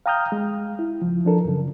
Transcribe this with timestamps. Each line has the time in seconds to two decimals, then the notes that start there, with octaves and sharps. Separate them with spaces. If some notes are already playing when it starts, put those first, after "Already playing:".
0.06 F5 G5 A#5 D#6 F6 G6
0.32 G#3
0.79 E4
1.02 C#2 F3
1.25 F3 D4 A4 A#4
1.45 F#2 C#3